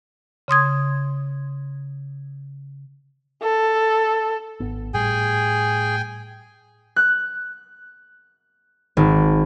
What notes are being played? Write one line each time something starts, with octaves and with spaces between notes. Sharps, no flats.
C#3 C6 D#6 G#6
A4
G#1 B3
A2 G3 G#4 G5 G#5
F#6
G#1